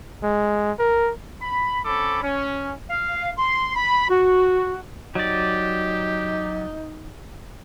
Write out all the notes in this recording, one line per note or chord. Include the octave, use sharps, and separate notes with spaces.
G#3
A#4
B5
C4 C#4 A4 B5 D6
C#4
F5
C6
B5
F#4
F#3 D#4 G4 D5